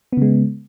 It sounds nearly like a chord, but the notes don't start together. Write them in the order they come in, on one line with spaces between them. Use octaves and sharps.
B3 C#3 G#3